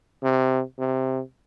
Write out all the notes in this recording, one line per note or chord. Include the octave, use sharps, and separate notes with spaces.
C3
C3